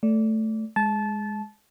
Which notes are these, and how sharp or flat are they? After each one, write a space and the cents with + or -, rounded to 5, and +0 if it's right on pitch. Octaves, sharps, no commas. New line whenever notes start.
A3 +0 D5 -20
G#3 +0 A5 -20